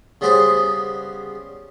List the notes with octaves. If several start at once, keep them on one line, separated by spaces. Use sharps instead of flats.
C#3 G3 B3 G#4 C5